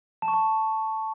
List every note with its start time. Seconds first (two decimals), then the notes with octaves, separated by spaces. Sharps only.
0.22 A5
0.28 C#6
0.34 A5